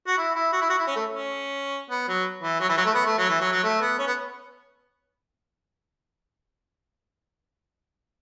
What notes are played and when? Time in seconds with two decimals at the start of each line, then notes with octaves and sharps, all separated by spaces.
0.08 F#4
0.18 E4
0.35 E4
0.53 F#4
0.61 E4
0.70 F#4
0.79 E4
0.87 C#4
0.96 A3
1.13 C#4
1.90 B3
2.08 F#3
2.43 E3
2.60 F#3
2.69 E3
2.77 F#3
2.85 A3
2.94 B3
3.06 A3
3.18 F#3
3.29 E3
3.41 F#3
3.52 F#3
3.64 A3
3.81 B3
3.99 C#4
4.07 B3